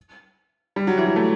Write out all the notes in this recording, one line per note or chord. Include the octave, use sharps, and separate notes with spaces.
G3
F#3
E3
F#3
A3